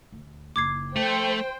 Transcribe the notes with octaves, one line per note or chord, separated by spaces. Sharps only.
D2
F#1 D#4 D6 G#6 C7
F3 A3 C5 G5